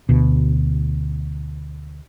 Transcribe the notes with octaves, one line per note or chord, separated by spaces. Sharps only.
D2 B2